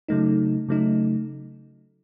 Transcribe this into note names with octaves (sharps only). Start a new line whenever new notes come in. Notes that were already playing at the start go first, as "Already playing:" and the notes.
C#3 F#3 A3 D#4
C#3 F#3 A3 D#4